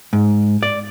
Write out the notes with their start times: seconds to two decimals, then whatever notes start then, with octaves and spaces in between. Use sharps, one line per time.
0.13 G#2
0.63 D5